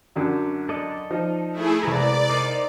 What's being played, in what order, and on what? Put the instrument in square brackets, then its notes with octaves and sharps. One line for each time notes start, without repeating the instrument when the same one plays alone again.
[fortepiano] F#2 D3 F#3
[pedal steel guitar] A4 D5 D#5
[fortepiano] F3 D#4
[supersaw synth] A3 E4 G#4
[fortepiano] C2 G#3 [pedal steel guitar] B4 A#5 [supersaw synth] D5
[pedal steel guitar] D#4 A#4 C5